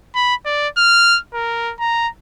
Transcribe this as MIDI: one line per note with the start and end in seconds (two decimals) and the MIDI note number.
0.15 0.35 83
0.46 0.68 74
0.77 1.19 89
1.34 1.73 70
1.80 2.08 82